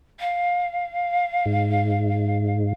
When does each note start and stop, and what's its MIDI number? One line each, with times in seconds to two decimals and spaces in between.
0.19 2.71 77
1.46 2.73 44